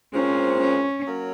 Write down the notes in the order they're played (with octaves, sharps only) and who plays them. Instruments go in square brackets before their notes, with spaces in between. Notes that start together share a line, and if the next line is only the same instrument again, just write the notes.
[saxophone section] A#2 G#3 C4 F4 C5 [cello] C#4
[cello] C#4
[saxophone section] F#3 A#3 C#4